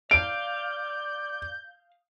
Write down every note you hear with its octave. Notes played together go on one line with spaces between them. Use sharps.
D5 F5 G6 D7